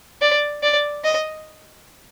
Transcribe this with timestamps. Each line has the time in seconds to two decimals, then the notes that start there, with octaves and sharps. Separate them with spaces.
0.21 D5
0.63 D5
1.04 D#5